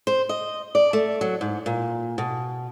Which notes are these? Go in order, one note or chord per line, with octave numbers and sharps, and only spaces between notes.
C5
D#5
D5
A3
F#3
G#2
A#2
B2